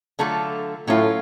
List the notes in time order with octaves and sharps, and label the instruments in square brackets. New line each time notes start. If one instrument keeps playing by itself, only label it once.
[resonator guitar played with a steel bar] D3 F#3 A3 F4 A4
[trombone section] A2 [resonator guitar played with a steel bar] F#3 C#4 F4